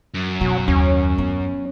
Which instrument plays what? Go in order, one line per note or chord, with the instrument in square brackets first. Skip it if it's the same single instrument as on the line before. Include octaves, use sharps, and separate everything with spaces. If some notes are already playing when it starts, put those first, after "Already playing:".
[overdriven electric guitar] F#2
[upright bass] B2 [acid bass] F#3
[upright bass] D#2 [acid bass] C#4
[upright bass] B3